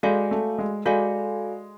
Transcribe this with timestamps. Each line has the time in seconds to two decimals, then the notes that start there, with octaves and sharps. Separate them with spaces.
0.03 G#3 F#4 A4 D5 F5 G#5
0.31 A3
0.58 G#3
0.86 G#3 F#4 A4 D5 F5 G#5